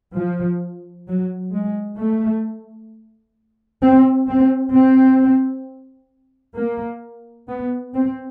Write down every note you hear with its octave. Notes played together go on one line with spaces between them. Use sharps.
F3
F#3
G#3
A3
C4
C4
C4
A#3
B3
C4